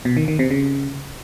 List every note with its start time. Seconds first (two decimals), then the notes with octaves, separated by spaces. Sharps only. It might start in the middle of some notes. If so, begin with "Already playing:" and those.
0.05 B2
0.17 D#3
0.28 D#3
0.39 C3
0.51 C#3